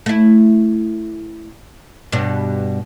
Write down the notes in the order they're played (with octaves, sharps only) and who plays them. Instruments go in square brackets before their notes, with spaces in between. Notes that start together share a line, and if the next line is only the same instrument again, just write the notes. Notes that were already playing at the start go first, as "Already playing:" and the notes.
[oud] A3 E4
G2 B2 D4